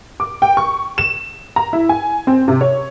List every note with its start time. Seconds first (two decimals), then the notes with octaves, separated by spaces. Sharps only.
0.20 D6
0.42 G5
0.57 C#6
0.98 E7
1.56 A#5
1.73 E4
1.89 G#5
2.27 C4
2.48 C3
2.61 C#5